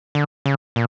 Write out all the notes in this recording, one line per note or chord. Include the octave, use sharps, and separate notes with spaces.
D3
C#3
A#2